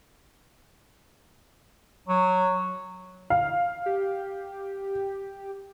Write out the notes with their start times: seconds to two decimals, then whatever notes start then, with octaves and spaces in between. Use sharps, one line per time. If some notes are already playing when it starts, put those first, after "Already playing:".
2.08 F#3
3.30 F5
3.86 G4